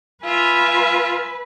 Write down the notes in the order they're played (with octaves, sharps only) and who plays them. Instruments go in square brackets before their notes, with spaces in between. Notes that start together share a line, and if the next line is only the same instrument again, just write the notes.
[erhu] F4 [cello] B4 [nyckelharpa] E5 G#5